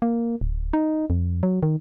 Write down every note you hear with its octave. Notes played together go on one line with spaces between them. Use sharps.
A#3
D1
D#4
F2
F#3
D#3